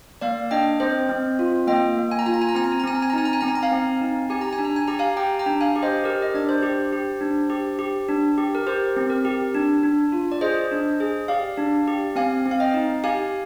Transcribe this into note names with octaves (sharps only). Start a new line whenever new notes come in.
A#3 D5 F5
D4 D#5 G5
C4 C5 D#5
C4
F4
A#3 D#5 G5
A#3
G#5
A#5
F4 G#5
A#5
G#5
A#5
C4 G#5
A#5
G#5
A#5
C4 G#5
A#5
G#5
A#5
D#4 G#5
A#5
G#5
C4 A#5
G#5
A#5
F5 G#5
C4
D#4
G4 G#5
A#5
G#5
D4
A#5
G#5
G4 A#5
F5 G#5
G4 G5 A#5
G5 A#5
D4
F5 G#5
G4
C5 D#5
G4 A#4
D#5
D4 D5
C5
G4
G4
D4
G4
G4
D4
G4
A#4
G4 C5
C4
A#4
G4
D4
D4
F4
D5
G#4 C5 D#5
D4
G#4
G4 D5 F5
D4
G4
C4 F5 G#5
C4
F5
D#5 G5
D#4
G4 F5 G#5